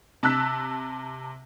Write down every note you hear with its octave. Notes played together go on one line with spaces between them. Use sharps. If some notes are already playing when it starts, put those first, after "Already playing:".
C3 A5 E6 F#6 B6